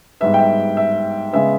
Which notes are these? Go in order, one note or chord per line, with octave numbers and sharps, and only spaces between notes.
G#2 G3 B3 E5
G5
E5
E5
C#3 G#3 B3 E5